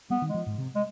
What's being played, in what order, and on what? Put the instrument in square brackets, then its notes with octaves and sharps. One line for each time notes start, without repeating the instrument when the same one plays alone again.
[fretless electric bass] G3 [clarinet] B3
[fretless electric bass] D#3
[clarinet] G#3
[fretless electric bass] F3
G#2
C3
[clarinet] G#3